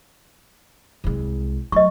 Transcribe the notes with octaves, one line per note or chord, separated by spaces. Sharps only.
C2 G#3
F#3 A3 D#5 C#6